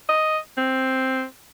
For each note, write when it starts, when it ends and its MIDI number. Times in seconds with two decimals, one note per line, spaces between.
0.09 0.38 75
0.57 1.24 60